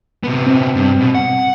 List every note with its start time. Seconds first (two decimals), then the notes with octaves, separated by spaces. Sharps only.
0.23 C3 B3
0.47 C4
0.75 G2
1.01 B2
1.15 F#5